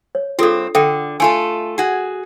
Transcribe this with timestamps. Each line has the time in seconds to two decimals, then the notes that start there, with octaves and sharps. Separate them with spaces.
0.15 C#5
0.39 G2 C4 F4 G#4 A4
0.75 D3 A4 E5 G5
1.20 A3 F4 A4 G#5
1.78 F#4 G#4